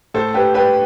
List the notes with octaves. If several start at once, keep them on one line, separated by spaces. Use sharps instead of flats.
A2 A4 C5
G4 B4
G3 G4 B4